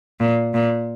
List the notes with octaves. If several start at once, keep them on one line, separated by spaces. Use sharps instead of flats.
A#2
A#2